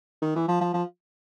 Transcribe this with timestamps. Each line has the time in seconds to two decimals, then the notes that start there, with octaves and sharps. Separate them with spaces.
0.22 D#3
0.36 E3
0.48 F3
0.61 F3
0.74 F3